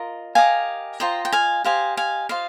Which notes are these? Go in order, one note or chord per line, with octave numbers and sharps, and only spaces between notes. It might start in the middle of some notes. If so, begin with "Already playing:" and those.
Already playing: F4 A#4 D#5
G4 A#4 D#5 F5 G#5
F4 C5 D#5 G5 A#5
G5
F5 G#5
G4 C5 D#5 F5 G#5
F5 G#5
F4 C5 D#5 F5